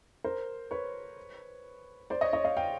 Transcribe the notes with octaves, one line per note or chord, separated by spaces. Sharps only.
A#4 C5
B4 C#5
C5 D5
C#5 D#5
C#5 D#5
D#5 F5
F5 G5